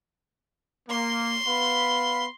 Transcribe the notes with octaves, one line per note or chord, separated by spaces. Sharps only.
A#3 C6
B3 F5 B5